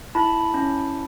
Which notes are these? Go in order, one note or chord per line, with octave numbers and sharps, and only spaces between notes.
E4 A5 B5
C#4